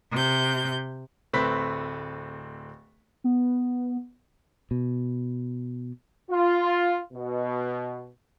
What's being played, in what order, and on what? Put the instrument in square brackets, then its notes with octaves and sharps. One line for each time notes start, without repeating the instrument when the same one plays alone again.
[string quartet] C3 G6
[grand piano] D1 A3 C4 B4 B6
[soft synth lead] B3
[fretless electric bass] B2
[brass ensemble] F4
B2